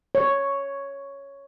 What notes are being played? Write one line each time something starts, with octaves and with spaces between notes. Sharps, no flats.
C#5